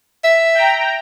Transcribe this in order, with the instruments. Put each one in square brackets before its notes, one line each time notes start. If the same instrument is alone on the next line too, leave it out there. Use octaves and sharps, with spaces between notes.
[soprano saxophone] E5
[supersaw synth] G5 A#5